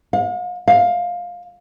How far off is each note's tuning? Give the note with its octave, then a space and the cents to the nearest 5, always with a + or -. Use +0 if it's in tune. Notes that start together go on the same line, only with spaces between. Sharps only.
F5 +45
F5 +15